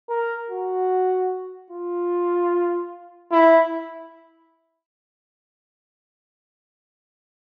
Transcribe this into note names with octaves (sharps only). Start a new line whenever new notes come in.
A#4
F#4
F4
E4